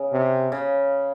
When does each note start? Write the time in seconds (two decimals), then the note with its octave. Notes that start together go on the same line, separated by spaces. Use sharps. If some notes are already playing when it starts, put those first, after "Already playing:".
Already playing: C#3
0.13 C3
0.52 C#3